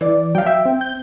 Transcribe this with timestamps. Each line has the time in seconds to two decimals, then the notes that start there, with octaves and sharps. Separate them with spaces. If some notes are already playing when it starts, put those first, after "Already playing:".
0.01 E3 D5
0.35 F#3 F5 G5
0.46 E5
0.65 C4
0.81 G6